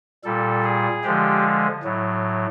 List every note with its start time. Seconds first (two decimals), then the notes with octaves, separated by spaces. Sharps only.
0.24 A#2 G3 A4
0.64 G#4
1.03 D3 F3 G#3 G4
1.83 A2 F#3